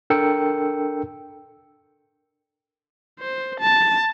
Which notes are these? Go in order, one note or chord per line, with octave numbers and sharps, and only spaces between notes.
D4 A4 A#4 G5 E6 C#7
C5
A5